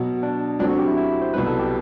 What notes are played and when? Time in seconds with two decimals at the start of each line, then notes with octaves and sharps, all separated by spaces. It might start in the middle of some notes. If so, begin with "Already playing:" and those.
Already playing: B2 F#3 B3 F#4
0.23 D4
0.59 D2 D3 F#3 C4 D4
0.69 F#4
0.79 G4
0.87 E4
0.97 E4
1.22 C5
1.34 C2 B2 F#3 B4
1.47 A4
1.59 G4